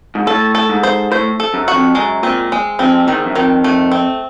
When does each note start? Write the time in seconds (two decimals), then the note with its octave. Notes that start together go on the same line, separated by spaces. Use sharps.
0.15 G#2
0.26 A2 A4
0.55 A4
0.69 G#2
0.83 C5
1.11 A2 C5
1.40 A4
1.54 F#2
1.68 F#4
1.74 F2
1.95 F#2 G#3
2.23 A#2 C4
2.52 G#3
2.79 F2 C4
3.07 E2 D#3
3.25 F#2
3.35 F2 D#3
3.64 F2 A3
3.92 C4